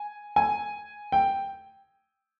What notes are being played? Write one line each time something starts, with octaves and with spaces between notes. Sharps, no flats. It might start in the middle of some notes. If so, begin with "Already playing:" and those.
Already playing: G#5
G#5
G5